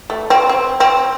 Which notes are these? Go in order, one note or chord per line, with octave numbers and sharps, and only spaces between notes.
A3
C4
C4
C4